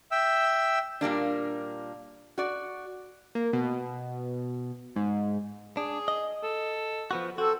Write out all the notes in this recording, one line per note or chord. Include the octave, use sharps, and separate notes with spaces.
E5 G5 E6
A#2 G3 A#3 D4
F#4 D5
A#3
B2
G#2
D4 G#4
D#5
A4
F3 B3 F#4
C4 F#4 A4